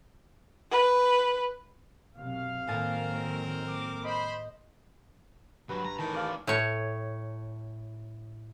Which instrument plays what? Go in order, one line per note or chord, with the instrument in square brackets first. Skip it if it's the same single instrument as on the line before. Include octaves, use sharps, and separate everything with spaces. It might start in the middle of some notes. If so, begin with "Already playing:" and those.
[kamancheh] B4
[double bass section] B1 F#2 C3 [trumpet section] F5
[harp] A2 G#5 A6 [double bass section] D#3 F#3 A#3 [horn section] C4 A#4
[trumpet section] D6
[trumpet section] C5 B5 [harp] D#5
[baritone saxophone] G2 [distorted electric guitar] F#3 [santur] B4
[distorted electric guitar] A#5
[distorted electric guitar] A2 E3 [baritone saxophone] D#3 [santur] A5
[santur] D5 F5 A5
[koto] A2 C#5